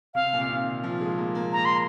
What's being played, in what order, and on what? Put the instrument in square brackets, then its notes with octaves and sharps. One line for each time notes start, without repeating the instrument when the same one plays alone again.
[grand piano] C3 [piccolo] F5
[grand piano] A#2
C3
D#3
F3
G#3
A#3
A#3
[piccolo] A#5
C6